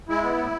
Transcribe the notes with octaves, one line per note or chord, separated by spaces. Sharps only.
G#3 E4
B3
A2